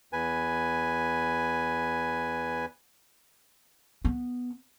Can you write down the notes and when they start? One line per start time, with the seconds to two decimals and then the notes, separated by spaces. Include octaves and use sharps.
0.13 E2 B4 G#5
4.05 B3